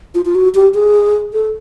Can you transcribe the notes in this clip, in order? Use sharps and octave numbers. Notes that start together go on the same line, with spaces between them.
F4
F4
F#4
G4
G#4
A4